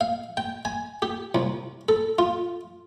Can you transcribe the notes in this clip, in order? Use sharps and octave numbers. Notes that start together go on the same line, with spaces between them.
F5
G5
G#5
G4
C2
A4
F4